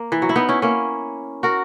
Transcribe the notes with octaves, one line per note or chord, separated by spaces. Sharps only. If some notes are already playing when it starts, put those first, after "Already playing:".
Already playing: A#3
E3
F#3
E4
B3 D#4
C#4 E4
A#3 C#4
F#4 A#4